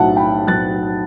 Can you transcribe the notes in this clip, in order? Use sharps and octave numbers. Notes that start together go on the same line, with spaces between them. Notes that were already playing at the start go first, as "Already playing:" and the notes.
Already playing: B1 A2 F#3 F#5 A5
G5 B5
B1 A2 F#3 F#6 A6